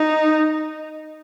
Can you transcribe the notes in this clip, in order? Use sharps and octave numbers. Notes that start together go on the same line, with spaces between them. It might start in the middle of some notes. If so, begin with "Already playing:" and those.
Already playing: D#4